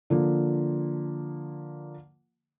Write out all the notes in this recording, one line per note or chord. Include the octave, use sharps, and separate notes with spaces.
D3 F3 A#3